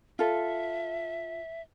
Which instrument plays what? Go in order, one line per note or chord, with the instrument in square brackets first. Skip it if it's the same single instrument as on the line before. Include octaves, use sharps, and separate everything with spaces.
[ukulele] F4 A4 [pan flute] E5